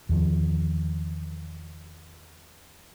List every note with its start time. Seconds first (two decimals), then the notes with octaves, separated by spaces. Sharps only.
0.09 E2 D#3 F3